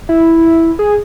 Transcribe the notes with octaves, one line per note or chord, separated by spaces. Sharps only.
E4
G#4